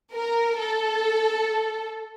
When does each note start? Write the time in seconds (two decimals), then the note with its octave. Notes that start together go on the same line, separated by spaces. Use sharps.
0.13 A#4
0.58 A4